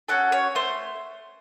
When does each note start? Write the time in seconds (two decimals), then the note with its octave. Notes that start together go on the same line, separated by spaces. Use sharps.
0.08 C#4 F#4 A4 F#5
0.32 C#5
0.55 A3 C5